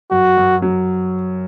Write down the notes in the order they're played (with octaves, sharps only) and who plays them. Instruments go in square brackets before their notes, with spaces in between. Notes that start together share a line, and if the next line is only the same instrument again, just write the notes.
[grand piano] F#2 [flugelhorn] F#4
[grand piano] F#2
F#3